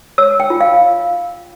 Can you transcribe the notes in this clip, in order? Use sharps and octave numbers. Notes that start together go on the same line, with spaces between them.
C#5 E6
G5
F4
F5